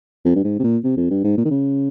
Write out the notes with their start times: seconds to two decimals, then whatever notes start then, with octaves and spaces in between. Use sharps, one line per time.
0.25 F2
0.36 G2
0.44 G#2
0.59 C3
0.64 A#2
0.84 C3
0.97 F2
1.10 G2
1.24 G#2
1.38 A#2
1.45 D#3
1.51 C#3